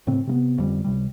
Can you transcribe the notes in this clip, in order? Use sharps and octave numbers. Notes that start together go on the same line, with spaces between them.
D1 A2 C#3 C4
C3 A#3 B3
G1 F2 D3 G3
C#2 C3 G3